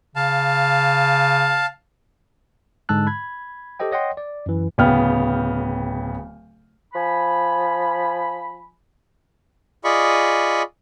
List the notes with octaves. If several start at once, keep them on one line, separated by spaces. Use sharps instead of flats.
C#3 F5 A5
G#2 D3 G#3 A5 E6 F#6
B5 G#6
G4 A4 C5 D#5 G5
C#5 D#5 F#5 G5 C6
D5
F#2 E3
D1 C#3 B3 G5 F6
F3 G#5 B5
F4 G#4 D5 D#5 B5 C#6